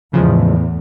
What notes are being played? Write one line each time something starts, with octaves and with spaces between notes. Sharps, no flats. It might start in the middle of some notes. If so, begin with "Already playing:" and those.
E2 A2 C#3 F3 G#3